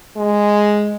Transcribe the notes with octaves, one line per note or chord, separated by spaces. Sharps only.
G#3